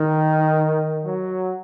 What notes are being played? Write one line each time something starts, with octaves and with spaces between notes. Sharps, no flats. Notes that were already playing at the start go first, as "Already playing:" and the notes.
Already playing: D#3
F#3